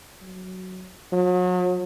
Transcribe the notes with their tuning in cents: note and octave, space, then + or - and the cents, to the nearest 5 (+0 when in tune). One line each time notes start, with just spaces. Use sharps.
F#3 +5
F#3 -40